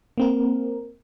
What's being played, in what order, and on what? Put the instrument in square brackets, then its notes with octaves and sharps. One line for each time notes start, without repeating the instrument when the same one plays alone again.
[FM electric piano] A#3 C4 A#4